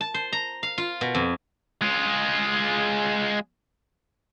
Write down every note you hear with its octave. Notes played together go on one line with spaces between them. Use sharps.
A5
C5
A#5
F5
F4
B2
F2
G#3 F4